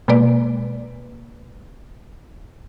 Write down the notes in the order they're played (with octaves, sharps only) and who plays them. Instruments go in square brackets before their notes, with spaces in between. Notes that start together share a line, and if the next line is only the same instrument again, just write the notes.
[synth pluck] B2 G#3 A#3 B4 D5